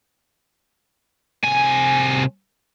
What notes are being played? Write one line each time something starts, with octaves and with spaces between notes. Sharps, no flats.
C2 G#5